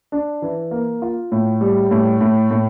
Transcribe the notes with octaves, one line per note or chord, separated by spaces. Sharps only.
D4
E3
A#3
F4
A2
G3
A2
A2
A2